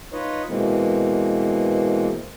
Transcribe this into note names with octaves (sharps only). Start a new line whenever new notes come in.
D#4 F4 B4 C#5 D#5
B2 E3 G#3 A#3 C4